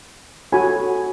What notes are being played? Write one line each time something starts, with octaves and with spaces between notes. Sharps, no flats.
F#4 A4 C#5 G#5 B5